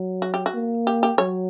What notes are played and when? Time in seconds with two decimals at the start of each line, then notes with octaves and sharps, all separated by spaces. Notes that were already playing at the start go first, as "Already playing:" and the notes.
Already playing: F#3
0.22 F#4
0.34 G4
0.46 F#4
0.55 A#3
0.87 G4
1.03 G4
1.18 F#3 C#5